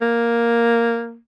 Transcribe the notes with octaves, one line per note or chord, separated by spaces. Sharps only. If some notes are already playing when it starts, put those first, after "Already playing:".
A#3